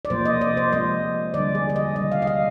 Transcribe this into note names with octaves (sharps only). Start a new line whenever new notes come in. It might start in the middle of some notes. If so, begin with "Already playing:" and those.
D5
C3 F3 A#3 C5
D#5
D5
C5
F3 G#3 C4 D#5
D3 G3 D4 D5
G#4
D5
D#5
C3 D#3 G3 D#5
F5
D#5
F5